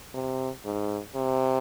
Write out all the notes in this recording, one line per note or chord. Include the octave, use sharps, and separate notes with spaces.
C3
G#2
C3